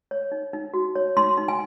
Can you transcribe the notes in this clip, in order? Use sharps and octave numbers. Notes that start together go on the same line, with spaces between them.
C#5
D#4
D#4
F#4
C#5
D#4 C6
D#4
G#5